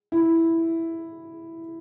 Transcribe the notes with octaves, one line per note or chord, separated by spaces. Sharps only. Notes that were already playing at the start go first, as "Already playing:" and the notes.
E4